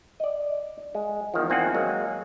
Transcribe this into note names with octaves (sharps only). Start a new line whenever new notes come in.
D5 D#5
G#3
E2 D#3 F3
E2 A#3 C4 D#4 F#5 G#5
F#3 G#3 A#3 G#4